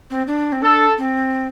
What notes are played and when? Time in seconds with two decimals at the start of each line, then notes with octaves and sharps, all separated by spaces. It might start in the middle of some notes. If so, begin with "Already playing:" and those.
0.11 C4
0.27 D4
0.52 C4
0.62 D4 A4
0.98 C4